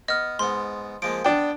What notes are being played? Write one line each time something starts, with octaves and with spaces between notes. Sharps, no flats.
B3 D#5 F6
G#2 B3 C6
F3 G#3 A#3 D7
B3 D4 G5